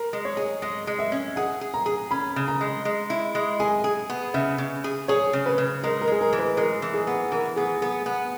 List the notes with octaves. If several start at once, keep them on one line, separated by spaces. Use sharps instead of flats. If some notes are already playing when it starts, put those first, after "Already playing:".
Already playing: A#4
G#3
C#5
G#4
G#3 D#5
G#3
E5
C#4
G#4 F#5
G#4
A#5
G#4
C#4 B5
C#3
A#5
G#3
G#3
E4
G#3
G#4 G#5
G#4
B3
C#3 E5
C#3
G#4
G#4 C#5
C#3
B4
C#3
G#3 A#4
A#4
G#3 G#4
A#4
E3
B4
G#3 A#4
E3
G#4
B3
E3 A#4
B3 G#4
B3 G#4
B3